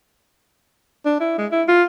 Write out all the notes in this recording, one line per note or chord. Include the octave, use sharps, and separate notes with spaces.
D4
E4
G#3
E4
F4